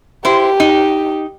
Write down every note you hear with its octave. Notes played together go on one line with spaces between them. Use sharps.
E4 G4 C5
D#4